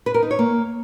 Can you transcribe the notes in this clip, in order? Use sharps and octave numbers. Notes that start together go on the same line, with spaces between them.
B4
A#4
D#4
C#5
A#3